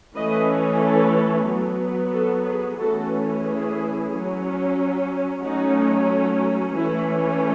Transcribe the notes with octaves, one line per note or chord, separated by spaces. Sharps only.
E3 A3 C#4 B4 D#5
A4 C#5
F#3 B3
F#4 A4
G#4 B4
E3 A3 C#4 F#4 A4
E4 G#4
F#3 C#4
F#3 A3 C#4 D#4 F#4
E3 A3 C#4 E4